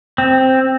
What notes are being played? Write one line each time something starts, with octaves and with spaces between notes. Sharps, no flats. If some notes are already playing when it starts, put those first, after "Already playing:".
C4